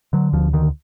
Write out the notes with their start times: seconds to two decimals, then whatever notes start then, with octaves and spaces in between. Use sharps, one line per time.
0.13 D3 F#3
0.33 D2 F3
0.53 D3 D#3